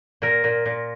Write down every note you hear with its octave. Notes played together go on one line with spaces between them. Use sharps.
A#2 A#4
A#2
A#2